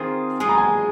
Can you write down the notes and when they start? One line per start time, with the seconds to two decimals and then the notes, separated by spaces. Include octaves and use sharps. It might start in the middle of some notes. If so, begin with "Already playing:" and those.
Already playing: D#3 C4 F4 G#4
0.40 G#3 F4 G#4 G#5
0.49 A#5
0.58 G#5